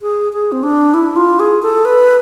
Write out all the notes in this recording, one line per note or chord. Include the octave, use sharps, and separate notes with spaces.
G#4
G#4
C4
D4
E4
F4
G#4
A4
B4